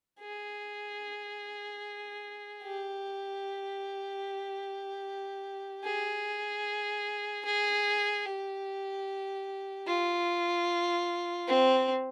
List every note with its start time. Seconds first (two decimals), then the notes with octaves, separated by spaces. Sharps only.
0.21 G#4
2.62 G4
5.84 G#4
7.45 G#4
8.26 G4
9.86 F4
11.48 C4